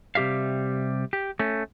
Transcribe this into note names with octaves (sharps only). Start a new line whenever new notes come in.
C3 G3 G4 E5 F5
G4
A3 C#4